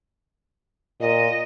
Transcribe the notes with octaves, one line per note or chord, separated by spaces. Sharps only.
A#2 D#5